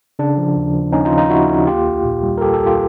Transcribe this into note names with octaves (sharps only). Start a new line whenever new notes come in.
C#3 D4
F3
D#2
F3
D#2 C#4 D#4
D#4 F4
F3
D#4 F4
F3 E4 F#4
D#2
A#3 F4 G4
C2
A#2
G3
A#4
G3 G4 A4
G4 A4
C2
F4 G4